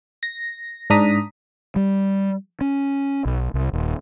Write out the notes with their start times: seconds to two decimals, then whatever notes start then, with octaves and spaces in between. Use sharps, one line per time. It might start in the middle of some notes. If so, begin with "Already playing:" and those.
0.23 A#6
0.90 G#2 D4 A#5 D#6 B6
1.76 G3
2.61 C#4
3.25 B1
3.54 C2
3.73 D#1